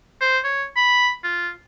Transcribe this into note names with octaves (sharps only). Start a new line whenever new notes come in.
C5
C#5
B5
F4